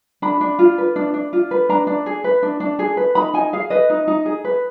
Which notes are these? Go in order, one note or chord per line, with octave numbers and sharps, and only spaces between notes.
D4 B5
D4
F4
B4
D4
D4
F4
B4
D4 A#5
D4
G#4
B4
D4
D4
G#4
B4
D#4 B5
D#4 G#5
G#4 F5
B4 D#5
D#4
D#4
G#4
B4